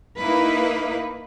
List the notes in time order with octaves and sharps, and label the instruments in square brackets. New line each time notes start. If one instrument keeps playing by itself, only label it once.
[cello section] A#3 D#4 E4 B4